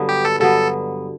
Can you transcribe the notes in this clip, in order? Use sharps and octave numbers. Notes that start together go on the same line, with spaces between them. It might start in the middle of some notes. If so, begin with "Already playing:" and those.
Already playing: G2 D3 F#3 B3
G4
A4
G2 D3 F#3 B3 A4